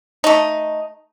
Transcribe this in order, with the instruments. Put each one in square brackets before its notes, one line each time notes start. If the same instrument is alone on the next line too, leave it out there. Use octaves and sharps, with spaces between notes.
[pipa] A3 D#4